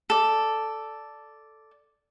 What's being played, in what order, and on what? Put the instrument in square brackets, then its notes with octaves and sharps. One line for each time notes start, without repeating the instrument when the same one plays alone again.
[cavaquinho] A4 D5